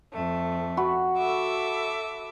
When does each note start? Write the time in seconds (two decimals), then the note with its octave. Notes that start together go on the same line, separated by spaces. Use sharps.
0.12 F2 A3
0.77 F#4 B5
1.18 A4 E5 D6